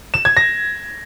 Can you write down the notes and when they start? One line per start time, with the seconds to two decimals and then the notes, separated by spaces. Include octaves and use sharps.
0.14 E7
0.25 G#6
0.37 A#6